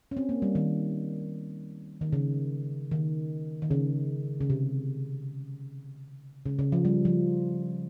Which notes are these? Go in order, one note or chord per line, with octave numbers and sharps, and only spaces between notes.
C#4
C4
A#3
G3
D#3
D#3
C#3
D#3
D#3
C#3
C#3
C3
C#3
C#3
F3
G3
F3